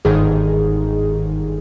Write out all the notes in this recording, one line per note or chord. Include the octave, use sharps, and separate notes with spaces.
G1 G#2 D#3 D#4 G#4